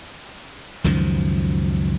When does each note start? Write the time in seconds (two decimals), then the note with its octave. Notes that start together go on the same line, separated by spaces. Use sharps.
0.84 C#2 F#2 D#3 F3